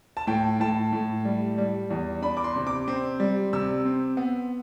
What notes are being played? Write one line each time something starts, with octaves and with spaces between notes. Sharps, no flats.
A5
A2 G5
A2 A5
A2
G3
G3
E2
D4 B5
D6
C6
C3
D6
C4
G3
C3 E6
C4
B3